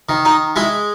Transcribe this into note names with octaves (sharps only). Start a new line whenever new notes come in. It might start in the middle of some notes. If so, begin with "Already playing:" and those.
D#3
D#4
G#3 E4